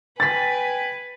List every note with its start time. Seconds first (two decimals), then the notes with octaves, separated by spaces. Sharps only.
0.20 B4 G5 G#5 A6 B6